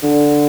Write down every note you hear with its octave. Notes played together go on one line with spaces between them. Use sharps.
D3